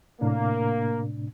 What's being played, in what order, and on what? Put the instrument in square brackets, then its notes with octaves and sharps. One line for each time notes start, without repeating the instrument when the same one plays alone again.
[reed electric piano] A2 C3 D4 [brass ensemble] A#3